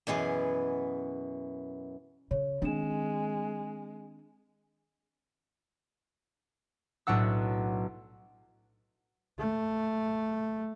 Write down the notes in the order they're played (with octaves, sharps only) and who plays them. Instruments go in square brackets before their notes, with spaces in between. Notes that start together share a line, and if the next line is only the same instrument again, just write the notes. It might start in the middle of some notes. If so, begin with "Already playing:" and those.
[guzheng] F#2 B2 E3 G#4
[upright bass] C#3 [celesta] C#5
[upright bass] D#3 C4 [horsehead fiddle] G#3 [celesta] D4 E7
[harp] B1 A2 D4 F#5 E6
[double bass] A3